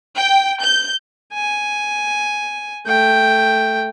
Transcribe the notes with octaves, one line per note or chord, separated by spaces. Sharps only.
G5
G6
G#5
A3 G5